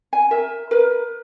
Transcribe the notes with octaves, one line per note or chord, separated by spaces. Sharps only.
G#5
A#4 E5
A#4 B4